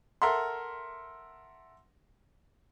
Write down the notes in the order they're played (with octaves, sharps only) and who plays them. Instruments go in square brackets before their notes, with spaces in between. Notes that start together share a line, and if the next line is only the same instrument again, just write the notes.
[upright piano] A4 A#4 E5 F#5 C6